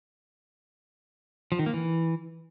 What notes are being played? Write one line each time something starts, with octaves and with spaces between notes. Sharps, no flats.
F3
D#3
A#3
E3